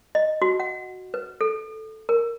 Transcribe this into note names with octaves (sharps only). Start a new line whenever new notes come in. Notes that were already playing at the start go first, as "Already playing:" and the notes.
D#5
F#4
F#5
B4
A4
A#4